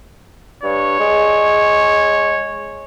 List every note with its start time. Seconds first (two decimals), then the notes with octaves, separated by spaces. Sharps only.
0.63 G2 C#5
1.00 G#3